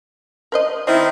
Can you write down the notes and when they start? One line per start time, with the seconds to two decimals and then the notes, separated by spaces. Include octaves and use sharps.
0.52 A#4 C5 D#5
0.87 D#3 C4 E4 D#5